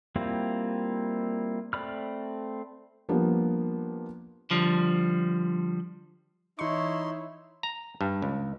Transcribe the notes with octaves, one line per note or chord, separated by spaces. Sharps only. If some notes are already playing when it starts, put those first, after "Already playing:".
G3 A#3 C4 E4 F4
A3 C4 D5 B5 F6
F3 G3 A#3 B3 D4
D3 F3 G3
E3 D#4 E4 C#5 C6 C#6
A#5
G2
C#2